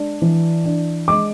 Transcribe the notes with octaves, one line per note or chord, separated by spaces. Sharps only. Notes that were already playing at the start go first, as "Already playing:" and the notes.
Already playing: G#3 D4
E3
D4
G#3 D6